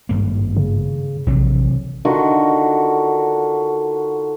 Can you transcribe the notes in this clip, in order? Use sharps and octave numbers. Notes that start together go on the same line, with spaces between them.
G#1 G2 A#3
C#3
A#1 C3 E3 F#3
D3 D#3 F4 F#4